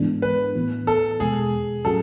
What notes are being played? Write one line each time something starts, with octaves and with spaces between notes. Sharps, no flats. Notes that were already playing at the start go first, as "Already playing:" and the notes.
Already playing: G#2 E3 G#3 B3 D4
B4
A2 E3 B3
A4
E2 B2 G#3 G#4
A2 F#3 C#4 F#4 A4